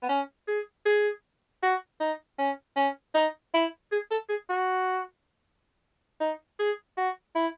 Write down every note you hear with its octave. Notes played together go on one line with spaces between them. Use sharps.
B3
C#4
G#4
G#4
F#4
D#4
C#4
C#4
D#4
E4
G#4
A4
G#4
F#4
D#4
G#4
F#4
E4